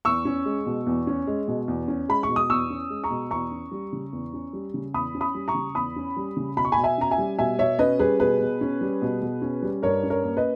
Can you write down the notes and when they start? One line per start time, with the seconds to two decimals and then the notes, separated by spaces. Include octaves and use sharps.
0.05 E2 C#6 E6
0.25 C#4
0.46 G#3
0.66 B2
0.86 E2
1.07 C#4
1.27 G#3
1.48 B2
1.68 E2
1.88 C#4
2.09 G#3 B5
2.23 C#6
2.29 B2
2.36 D#6
2.50 E2 C#6 E6
2.70 C#4
2.90 G#3
3.04 A#5 C#6
3.10 B2
3.31 E2 A#5 C#6
3.51 C#4
3.71 G3
3.93 C#3
4.13 E2
4.33 C#4
4.53 G3
4.74 C#3
4.94 E2 B5 D#6
5.15 C#4
5.21 B5 D#6
5.35 G3
5.48 A#5 C#6
5.54 C#3
5.75 E2 B5 D#6
5.96 C#4
6.17 G3
6.37 C#3
6.57 B2 B5
6.65 C#6
6.72 G#5 B5
6.78 B2
6.84 E5 G#5
6.98 C#4 A#5
7.11 E5 G#5
7.18 G3
7.39 B2 E5 G#5
7.59 B2 C#5 E5
7.79 C#4 B4 D#5
7.99 G3 G#4 B4
8.20 B2 G#4 B4
8.41 B2
8.61 C#4
8.81 G3
9.02 B2
9.21 B2
9.42 C#4
9.62 G3
9.83 G2 A#4 C#5
10.03 C#4
10.10 A#4 C#5
10.24 A#3
10.37 B4 D#5